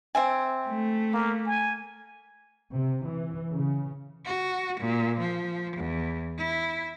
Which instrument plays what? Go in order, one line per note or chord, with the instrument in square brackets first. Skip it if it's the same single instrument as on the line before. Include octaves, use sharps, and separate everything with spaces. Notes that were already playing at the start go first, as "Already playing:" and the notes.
[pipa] C4 E5 G#5
[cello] A3
[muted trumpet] A#3
G#5
[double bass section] C3
E3
C#3
[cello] F#4
A#2
F3
E2
E4